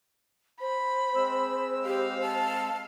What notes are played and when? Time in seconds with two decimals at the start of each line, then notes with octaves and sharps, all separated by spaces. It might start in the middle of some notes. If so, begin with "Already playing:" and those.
0.61 C5 B5
1.15 G#3 C4 E6
1.85 G4 F5
2.22 A5